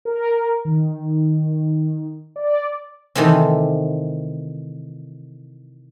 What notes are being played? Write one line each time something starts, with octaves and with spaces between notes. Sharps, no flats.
A#4
D#3
D5
C3 D#3 E3 A3 C4